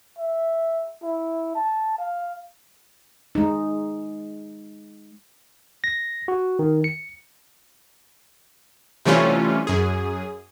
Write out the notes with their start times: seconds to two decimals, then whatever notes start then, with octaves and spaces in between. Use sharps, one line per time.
0.18 E5
1.03 E4
1.55 A5
1.98 F5
3.35 G#3 D#4
5.84 A#6
6.28 F#4
6.59 D#3
6.84 C#7
9.05 C3 E3 G3 A3 C#4 F4
9.67 F#2 G#4